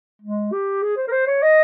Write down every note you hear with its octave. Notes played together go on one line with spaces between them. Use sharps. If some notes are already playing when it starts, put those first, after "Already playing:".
G#3
G4
G#4
C5
A#4
C5
C#5
D#5